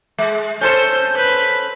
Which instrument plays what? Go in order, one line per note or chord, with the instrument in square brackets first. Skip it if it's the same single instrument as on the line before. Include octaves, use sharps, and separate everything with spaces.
[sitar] G#3
[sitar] C#4 A4 C5 [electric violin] G6
[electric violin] B4